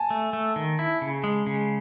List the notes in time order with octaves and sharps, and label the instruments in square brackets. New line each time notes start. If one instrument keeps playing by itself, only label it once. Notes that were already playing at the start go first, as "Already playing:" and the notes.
Already playing: [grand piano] G#5 A5
[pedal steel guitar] A3
A3
D#3
E4
C#3
G#3
C#3